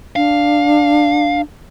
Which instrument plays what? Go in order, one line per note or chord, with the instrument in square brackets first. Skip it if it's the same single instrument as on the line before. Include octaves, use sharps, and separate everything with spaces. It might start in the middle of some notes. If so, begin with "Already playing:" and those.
[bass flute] D4 [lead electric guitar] F5